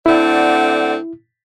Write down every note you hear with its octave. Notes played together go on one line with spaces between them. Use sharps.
D3 A3 C4 E4 D5 F#5